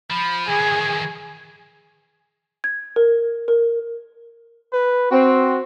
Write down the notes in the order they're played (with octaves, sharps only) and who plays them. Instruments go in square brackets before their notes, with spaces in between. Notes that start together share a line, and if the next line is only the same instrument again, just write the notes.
[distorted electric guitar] F3 [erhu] B5
[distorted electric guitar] D#3 E3 [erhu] G#4
[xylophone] G#6
A#4
A#4
[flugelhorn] B4
[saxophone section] C4 [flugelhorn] F#4